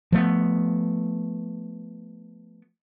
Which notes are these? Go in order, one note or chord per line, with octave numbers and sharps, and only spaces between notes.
F3 A3 B3